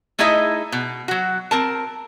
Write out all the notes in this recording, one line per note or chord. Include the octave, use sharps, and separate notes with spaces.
A3 D#4 E4 G#4 D#5 E5
B2
F#3 F#4
C4 A#4 A5